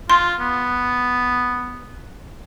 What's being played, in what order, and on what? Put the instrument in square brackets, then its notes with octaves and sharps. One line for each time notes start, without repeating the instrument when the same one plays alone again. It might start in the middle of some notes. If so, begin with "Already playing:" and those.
[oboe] F4 [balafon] C6
[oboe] B3